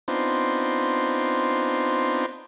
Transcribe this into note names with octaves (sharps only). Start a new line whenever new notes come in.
B3 C4 D4 D#4 F4 C5